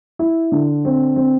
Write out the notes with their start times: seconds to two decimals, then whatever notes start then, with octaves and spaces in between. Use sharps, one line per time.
0.19 E4
0.52 D3
0.85 C4
1.16 C4